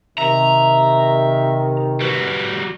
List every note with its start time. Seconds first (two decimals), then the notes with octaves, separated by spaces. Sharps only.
0.18 C3 D#3 E5 A#5
2.01 G3 F#4 B4